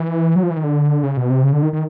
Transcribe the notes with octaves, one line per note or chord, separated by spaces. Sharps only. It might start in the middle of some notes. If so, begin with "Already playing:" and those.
Already playing: E3
F#3
F3
E3
D#3
D3
C#3
B2
C3
C#3
D3
D#3
D#3